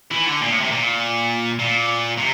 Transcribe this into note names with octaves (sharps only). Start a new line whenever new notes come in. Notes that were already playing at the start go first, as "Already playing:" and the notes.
E3
D3
A#2
A2
C3
A#2
A#2
C3